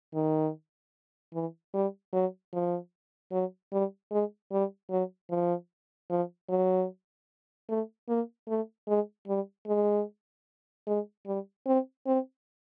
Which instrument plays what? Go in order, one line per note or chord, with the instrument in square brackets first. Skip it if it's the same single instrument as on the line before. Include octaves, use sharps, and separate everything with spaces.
[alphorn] D#3
E3
G3
F#3
F3
F#3
G3
G#3
G3
F#3
F3
F3
F#3
A3
A#3
A3
G#3
G3
G#3
G#3
G3
C4
C4